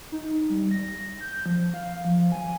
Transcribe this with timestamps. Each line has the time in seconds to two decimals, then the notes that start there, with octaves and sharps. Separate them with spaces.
0.12 D#4
0.50 G3
0.71 A#6
1.21 G6
1.46 F3
1.74 F5
2.05 F3
2.32 G#5